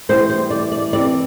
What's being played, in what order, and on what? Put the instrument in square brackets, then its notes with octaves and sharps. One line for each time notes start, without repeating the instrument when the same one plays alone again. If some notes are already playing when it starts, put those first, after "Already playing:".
[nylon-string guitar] A2 E3 G3 C5
C5
D5
D5
C3 E3 G3 D5